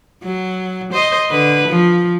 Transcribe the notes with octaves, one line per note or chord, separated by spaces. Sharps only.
F#3
C5 D#5
D3 B4
F3